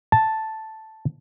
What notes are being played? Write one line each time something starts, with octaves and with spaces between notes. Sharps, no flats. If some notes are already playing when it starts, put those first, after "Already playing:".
A5